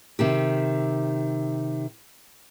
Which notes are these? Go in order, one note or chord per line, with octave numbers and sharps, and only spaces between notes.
C3 D#3 G4